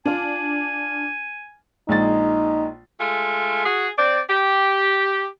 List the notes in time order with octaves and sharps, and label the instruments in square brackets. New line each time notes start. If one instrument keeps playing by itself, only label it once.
[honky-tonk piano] D4 F4 [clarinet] G#5
[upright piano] A#1 G#3 A6 [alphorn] D#4
[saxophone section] G#3 A3 F4
F#4 G#4
C4 D5
G4